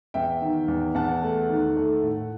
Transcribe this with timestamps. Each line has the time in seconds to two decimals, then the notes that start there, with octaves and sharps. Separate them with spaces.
0.14 E2 E5 G5
0.42 D#3
0.68 E2
0.95 E2 F#5 A5
1.23 A3
1.49 D#3
1.77 A3
2.03 A2